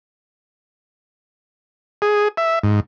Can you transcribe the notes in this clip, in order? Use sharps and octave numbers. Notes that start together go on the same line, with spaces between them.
G#4
E5
G#2